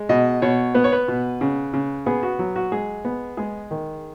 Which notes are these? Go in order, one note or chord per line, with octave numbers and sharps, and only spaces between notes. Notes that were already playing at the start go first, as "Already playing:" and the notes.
Already playing: G#3
B2 D#5
B2 C#5
B3 B4
C#5
B4
B2
C#3
C#3
B3 G#4
F#4
F#3
F#4
G#3 G#4
B3
G#3 G#4
D#3